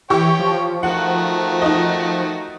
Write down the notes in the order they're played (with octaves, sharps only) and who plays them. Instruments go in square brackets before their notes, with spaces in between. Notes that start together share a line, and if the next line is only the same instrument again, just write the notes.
[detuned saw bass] E3 [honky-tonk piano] G4 C#6 [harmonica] C#5 G5
[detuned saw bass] F3
[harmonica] D#3 A3 F#4 [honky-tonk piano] F#5
[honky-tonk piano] D#4 D#5